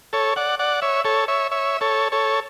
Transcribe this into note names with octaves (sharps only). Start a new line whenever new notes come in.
A4 C#5
D5 F#5
D5 F#5
C#5 E5
A4 C#5
C#5 E5
C#5 E5
A4 C#5
A4 C#5